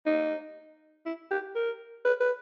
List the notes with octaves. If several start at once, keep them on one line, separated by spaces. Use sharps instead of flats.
D#4
E4
G4
A#4
B4
B4